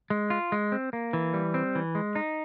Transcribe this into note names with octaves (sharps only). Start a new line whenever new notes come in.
G#3
F4
G#3
C4
A#3
E3
G3
C4
E3
G#3
D#4